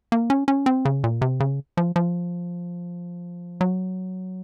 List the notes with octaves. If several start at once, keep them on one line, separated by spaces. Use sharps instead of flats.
A#3
C#4
C#4
C4
C#3
A#2
C3
C#3
F3
F3
F#3